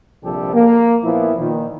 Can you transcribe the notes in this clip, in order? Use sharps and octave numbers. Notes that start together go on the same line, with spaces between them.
A#1 C3 F3 G3 G4 A4
A#3
A#2 F3 B3 E4
A#2 D#3